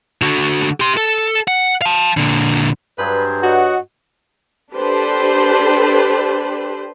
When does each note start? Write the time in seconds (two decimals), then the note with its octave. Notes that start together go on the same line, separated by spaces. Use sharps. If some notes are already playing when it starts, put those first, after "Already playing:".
0.22 D3 F#4
0.80 G4 C6
0.97 A4
1.48 F#5
1.82 F5 A5
2.17 A#2 D3
2.98 G2 F#3 G#4 B4 C5
3.43 F#4 C#5 D#5 F#5
4.72 D4 G4 A4 B4 C5